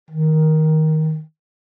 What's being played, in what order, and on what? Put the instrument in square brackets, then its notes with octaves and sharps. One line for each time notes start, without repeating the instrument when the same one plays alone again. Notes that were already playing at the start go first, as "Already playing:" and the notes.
[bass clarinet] D#3